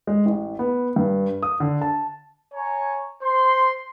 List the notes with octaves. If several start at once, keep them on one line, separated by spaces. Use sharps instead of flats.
G#3
A1
B3
G2
D#6
D3
A5
C#5 G#5 A#5
C5 C6